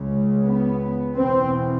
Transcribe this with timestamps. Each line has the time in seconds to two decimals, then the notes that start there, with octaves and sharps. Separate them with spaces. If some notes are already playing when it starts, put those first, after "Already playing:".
Already playing: C#2 C#3
0.44 B3
1.17 E2 B2 C4